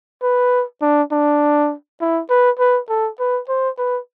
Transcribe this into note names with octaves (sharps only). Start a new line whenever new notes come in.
B4
D4
D4
E4
B4
B4
A4
B4
C5
B4